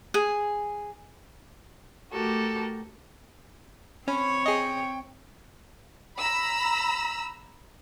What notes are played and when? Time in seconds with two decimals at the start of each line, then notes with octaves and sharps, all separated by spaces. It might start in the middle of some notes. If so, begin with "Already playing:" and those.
0.14 G#4
2.12 A3 F#4 G4 A4 A#4
4.08 C4 C#4 C#5 B5
4.46 G#4 D#5 G5
6.19 A#5 B5 E6